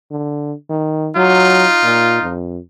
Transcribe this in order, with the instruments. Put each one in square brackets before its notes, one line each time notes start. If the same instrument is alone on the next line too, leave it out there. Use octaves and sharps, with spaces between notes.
[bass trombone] D3
D#3
[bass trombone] F#3 [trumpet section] D#4 F4
[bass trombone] A#2
F2